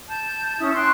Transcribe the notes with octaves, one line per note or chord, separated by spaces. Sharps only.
A5 G6
C#4 E4 D#6
G5 C6 C#6 F#6